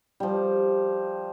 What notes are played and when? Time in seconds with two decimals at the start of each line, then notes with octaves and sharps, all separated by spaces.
0.20 F3 G3